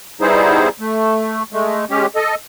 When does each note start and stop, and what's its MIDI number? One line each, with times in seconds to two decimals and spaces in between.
0.21 0.69 55
0.21 0.69 59
0.21 0.69 63
0.21 0.69 64
0.21 0.69 68
0.21 0.69 72
0.80 1.43 57
1.53 1.85 56
1.53 1.85 57
1.90 2.06 56
1.90 2.06 61
1.90 2.06 67
2.16 2.35 69
2.16 2.35 75